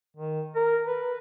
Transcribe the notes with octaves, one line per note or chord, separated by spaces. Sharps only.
D#3
A#4
B4